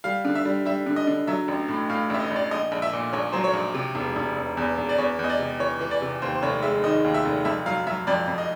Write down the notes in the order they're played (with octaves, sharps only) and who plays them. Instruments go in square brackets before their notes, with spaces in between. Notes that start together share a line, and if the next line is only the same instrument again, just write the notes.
[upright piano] G3 F5
D3
E5
G3
G3 E5
D3
D#5
D3
F#3 E5
A1
A2
A2 F5
A1 E5
D#5
A1 D5
A#1 D#5
A#1
E5
A#2
A#1 C#5
F#3 C5
C#5
A#1
C3
E1
E1
E1
E2
E1
D5
E2 C#5
E2
D#5
D5
C3
E3 C#5
E3
D5
C3
D#2 C5
C5
F1 C#5
G#3 E5
D#3 D#5
D#2
E5
F1
F2 E5
F#3 F5
F#3 E5
F2 D5
F2
D#5